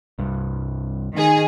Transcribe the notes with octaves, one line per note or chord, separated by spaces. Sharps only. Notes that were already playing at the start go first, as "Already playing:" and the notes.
C2 G2
D#3 G#4